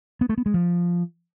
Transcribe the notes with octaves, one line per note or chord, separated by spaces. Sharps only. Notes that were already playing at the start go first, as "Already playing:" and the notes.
B3
A3
B3
G#3
F3